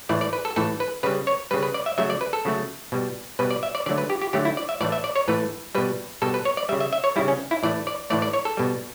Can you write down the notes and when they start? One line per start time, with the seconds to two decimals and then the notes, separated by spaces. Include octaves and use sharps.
0.09 A2 E3 A3 D5
0.21 D5
0.33 B4
0.45 A4
0.56 A2 E3 A3 A4
0.80 B4
1.03 C#3 G3 B4
1.27 C#5
1.51 C#3 G3 B4
1.63 B4
1.74 D5
1.86 E5
1.98 C#3 F#3 A3 E5
2.10 D5
2.21 B4
2.33 A4
2.45 C#3 F#3 A3
2.92 B2 G3
3.39 B2 G3 B4
3.51 D5
3.63 E5
3.75 D5
3.86 D3 F#3 A3 D5
3.98 B4
4.10 G4
4.22 G4
4.33 D3 F#3 A3 G4
4.45 E4
4.57 D5
4.69 E5
4.81 A2 E3 A3 D5
4.92 E5
5.04 D5
5.16 C#5
5.28 A2 E3 A3 B4
5.75 B2 G3 B4
6.22 B2 G3 A4
6.34 B4
6.45 C#5
6.57 D5
6.69 G3 E5
6.72 C#3
6.80 E5
6.93 E5
7.04 C#5
7.16 C#3 G3 E4
7.28 C#4
7.51 E4
7.63 A2 E3 A3 D5
7.87 D5
8.10 A2 E3 A3 D5
8.22 D5
8.33 C#5
8.45 A4
8.57 B2 G3